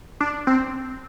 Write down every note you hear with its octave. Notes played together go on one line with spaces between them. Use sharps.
D4
C4